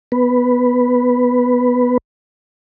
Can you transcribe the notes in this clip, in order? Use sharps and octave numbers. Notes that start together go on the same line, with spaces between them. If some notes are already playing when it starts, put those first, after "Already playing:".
B3 B4